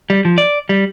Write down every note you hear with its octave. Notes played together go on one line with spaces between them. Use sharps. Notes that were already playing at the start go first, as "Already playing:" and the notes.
G3
F3
D5
G3